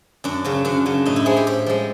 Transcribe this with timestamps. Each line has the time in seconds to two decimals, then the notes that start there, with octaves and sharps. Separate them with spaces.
0.24 F#2 D4
0.44 C#3 F#3
0.65 F#2 D4
0.86 C#3 F#3
1.06 A2 D#4
1.16 E4
1.26 F3 G#3 G#4
1.37 G4
1.47 A2 G4
1.66 F3 G#3